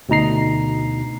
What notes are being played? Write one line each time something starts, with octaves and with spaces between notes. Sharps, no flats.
D2 B2 D#4 A#5 C7